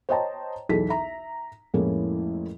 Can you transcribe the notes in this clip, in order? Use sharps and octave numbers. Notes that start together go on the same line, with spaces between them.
C5 C#5 D#5 G5 A5 A#5
B1 E2 E4 G#4 A4 B6
E5 A#5
F2 A2 G#3 A#3 C#4 E4